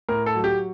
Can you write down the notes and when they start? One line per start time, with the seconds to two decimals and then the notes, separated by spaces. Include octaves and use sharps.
0.09 A2 A#4
0.26 A4
0.35 F#3
0.44 G4